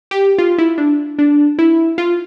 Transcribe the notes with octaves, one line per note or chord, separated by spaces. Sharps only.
G4
F4
E4
D4
D4
E4
F4